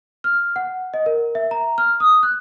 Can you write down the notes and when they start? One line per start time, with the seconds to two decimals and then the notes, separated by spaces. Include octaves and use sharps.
0.24 F6
0.56 F#5
0.94 D#5
1.06 A#4
1.35 E5
1.51 A#5
1.78 F6
2.00 D#6
2.23 F#6